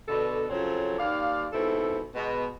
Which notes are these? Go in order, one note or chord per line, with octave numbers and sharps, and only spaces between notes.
B2 D3 A4
C#3 F3 F#3 C4 A4 C#5
D#2 D5 F5
G#2 B2 C4 E4 A4
B2 G#3 B3